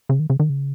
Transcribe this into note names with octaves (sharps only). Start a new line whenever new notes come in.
C#3
D#3
C#3
D#3
C#3